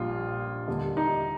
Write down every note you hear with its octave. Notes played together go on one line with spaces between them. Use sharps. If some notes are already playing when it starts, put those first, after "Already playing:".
Already playing: A#1 A#2 G3 F4
D#2 D3 G3
D#4